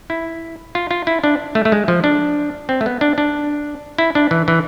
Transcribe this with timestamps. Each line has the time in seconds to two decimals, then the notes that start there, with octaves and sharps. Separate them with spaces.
0.10 E4
0.75 F4
0.91 F4
1.07 E4
1.24 D4
1.55 A3
1.65 A3
1.72 G#3
1.88 F3
2.04 D4
2.69 C4
2.81 A3
2.86 B3
3.01 D4
3.18 D4
3.98 E4
4.15 D4
4.31 E3
4.48 E3